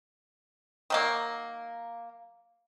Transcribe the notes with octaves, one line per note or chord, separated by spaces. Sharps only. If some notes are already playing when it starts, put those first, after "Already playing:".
D#3 F#3 A#3